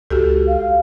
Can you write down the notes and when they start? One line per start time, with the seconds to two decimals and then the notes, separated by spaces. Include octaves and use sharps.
0.10 C#2 F#4 G4 A4
0.48 F5